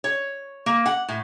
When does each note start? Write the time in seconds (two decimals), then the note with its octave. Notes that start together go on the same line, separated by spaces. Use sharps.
0.04 C#5
0.66 A#3
0.86 F#5
1.09 A2